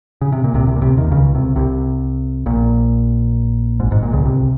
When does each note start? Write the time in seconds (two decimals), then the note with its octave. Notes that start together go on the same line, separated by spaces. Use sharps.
0.21 C#3
0.32 C3
0.44 A#2
0.54 C2 C3
0.67 C2 C3
0.76 A#2
0.81 C2 C3
0.97 D#2 D#3
1.11 C#2 C#3
1.35 C2 C3
1.56 C2 C3
2.46 A#1 A#2
3.80 G#1 G#2
3.91 G#1 G#2
4.02 A#1 A#2
4.13 C#2 C#3
4.25 C2 C3